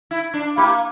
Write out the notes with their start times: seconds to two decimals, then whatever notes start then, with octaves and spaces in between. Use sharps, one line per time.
0.11 E4
0.34 D4
0.57 A#3 E4 G4